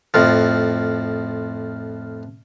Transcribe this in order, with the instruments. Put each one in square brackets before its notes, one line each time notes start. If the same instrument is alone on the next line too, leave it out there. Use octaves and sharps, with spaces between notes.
[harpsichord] F2 A2 F3